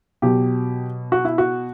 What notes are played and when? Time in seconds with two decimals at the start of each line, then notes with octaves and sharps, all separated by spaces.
0.22 B2 F#3 G4
1.12 F#4
1.25 E4
1.38 F#4